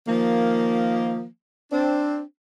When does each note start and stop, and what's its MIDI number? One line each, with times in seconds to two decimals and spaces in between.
0.07 1.25 51
0.07 1.25 53
0.07 1.25 58
1.71 2.21 60
1.71 2.21 62